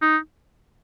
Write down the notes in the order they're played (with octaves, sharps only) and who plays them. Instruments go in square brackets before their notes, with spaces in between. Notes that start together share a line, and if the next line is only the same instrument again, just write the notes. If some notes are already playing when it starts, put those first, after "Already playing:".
[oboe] D#4